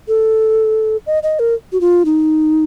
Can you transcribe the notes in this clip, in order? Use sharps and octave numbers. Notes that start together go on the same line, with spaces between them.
A4
D#5
D#5
A#4
F#4
F4
D#4